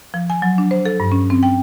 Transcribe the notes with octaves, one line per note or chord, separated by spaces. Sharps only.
F3
G#5
F#3
D4
C5
A4
G2
C#4
C4
G5